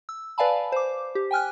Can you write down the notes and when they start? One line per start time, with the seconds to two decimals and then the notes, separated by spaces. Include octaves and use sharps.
0.09 E6
0.38 B4 D5 F5 G#5 A5 B5
0.72 C5 D6
1.15 G4
1.31 G5 G#5 F6 F#6